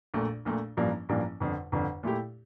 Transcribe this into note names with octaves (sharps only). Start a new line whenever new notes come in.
A#1 A#2 A3
A#1 A#2 A3
A1 G2 F3 A#3 D4
A1 G2 F3 A#3 D4
G1 F2 D3
G1 F2 D3
A#2 A3 E4 G4